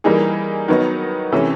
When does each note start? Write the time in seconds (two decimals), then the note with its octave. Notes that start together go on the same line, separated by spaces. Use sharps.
0.04 E3 G3 A#3 D#4 G#4
0.68 D#3 F#3 B3 D#4
1.32 C3 E3 A3 C#4